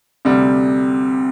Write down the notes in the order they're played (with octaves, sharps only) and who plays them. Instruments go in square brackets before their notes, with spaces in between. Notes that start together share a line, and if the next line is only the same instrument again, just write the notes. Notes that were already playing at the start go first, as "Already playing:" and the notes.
[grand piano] D2 C3 G3 [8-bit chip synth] C4